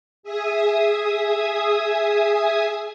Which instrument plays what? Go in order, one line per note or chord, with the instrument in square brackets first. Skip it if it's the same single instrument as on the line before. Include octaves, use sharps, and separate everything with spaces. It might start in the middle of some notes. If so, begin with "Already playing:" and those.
[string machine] G#4 E5 G#5 D#6